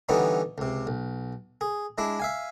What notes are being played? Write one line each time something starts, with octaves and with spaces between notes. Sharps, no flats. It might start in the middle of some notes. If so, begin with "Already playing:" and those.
D3 E3 G3 B3 C#4 D#4
C#2 C3
B1
G#4
G#3 D4 E4
E5 F5 G#5